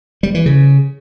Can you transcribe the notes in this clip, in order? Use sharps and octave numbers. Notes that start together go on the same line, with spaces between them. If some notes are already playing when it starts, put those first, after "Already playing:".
G3
E3
C#3